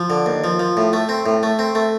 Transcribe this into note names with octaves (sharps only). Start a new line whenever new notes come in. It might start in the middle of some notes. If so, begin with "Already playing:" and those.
Already playing: F3
D3
D#2
F3
F3
A2
A3
C4
A2
A3
C4
A3